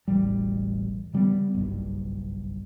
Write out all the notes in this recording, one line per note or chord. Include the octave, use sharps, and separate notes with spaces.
E1 A1 G3
C#3 G3 G#3 B3
F#1 B1 G2